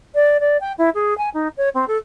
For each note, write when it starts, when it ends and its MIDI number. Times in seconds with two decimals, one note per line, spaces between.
0.15 0.37 74
0.40 0.57 74
0.61 0.73 79
0.78 0.90 64
0.94 1.16 68
1.18 1.29 80
1.34 1.48 63
1.57 1.69 73
1.74 1.85 60
1.88 1.97 69